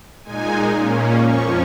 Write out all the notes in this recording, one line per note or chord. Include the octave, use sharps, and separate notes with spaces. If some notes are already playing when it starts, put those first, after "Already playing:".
A#2 G#3 D#4 G#5
A#2 A#3 C#4
F2 F3 C#4 C#6